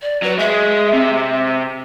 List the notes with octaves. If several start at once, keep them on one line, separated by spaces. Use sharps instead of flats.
D5
F#3 B4
G#3 E5
C3